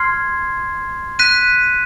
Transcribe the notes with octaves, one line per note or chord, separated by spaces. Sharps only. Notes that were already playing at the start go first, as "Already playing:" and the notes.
Already playing: C6 F6 G#6 C7
F#6 B6 D#7